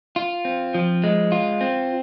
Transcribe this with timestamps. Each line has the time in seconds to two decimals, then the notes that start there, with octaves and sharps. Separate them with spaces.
0.16 F4
0.45 C4
0.74 F3
1.04 G#3
1.32 F4
1.61 C4